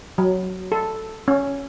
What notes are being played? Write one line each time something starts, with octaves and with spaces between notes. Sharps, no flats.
F#3
A4
C#4